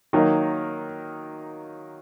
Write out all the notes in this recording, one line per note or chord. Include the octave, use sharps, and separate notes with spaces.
D#3 F#3 A#3 D#4